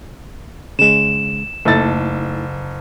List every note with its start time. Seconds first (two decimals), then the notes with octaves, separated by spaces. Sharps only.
0.79 C#3 G#3 E7
1.65 F#1 A3 D#4 E4 A4 A6